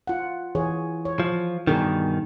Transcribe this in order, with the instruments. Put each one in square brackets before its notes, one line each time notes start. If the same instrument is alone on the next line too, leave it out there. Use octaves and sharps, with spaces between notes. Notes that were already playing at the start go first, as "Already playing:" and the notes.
[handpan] F4 F#5
E3 G#4 C#5
C#5
[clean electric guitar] F3
[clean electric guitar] G2 B2 D#3 [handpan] D#4 G#4 A#4